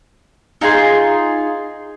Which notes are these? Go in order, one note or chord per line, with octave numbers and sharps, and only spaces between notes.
D#4 F4 G#4 C6